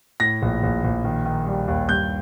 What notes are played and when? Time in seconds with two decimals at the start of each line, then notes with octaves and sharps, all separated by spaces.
0.20 A2 A#6
0.42 A#1
0.63 A#1
0.84 A#1
1.04 D#3
1.25 D#3
1.46 G3
1.68 D#2
1.89 G2 G6